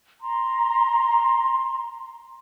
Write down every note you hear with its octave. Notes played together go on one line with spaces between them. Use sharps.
A#5 C6